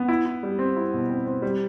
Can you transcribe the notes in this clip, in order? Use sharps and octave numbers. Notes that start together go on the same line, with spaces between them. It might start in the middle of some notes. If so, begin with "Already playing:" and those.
Already playing: B3
E4
E4
G3
C4
E4
B2
C4
C4
G3